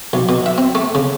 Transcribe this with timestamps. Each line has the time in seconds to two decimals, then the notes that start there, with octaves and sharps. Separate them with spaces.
0.13 B1
0.29 B2
0.46 E5
0.58 C4
0.75 A3
0.95 C#3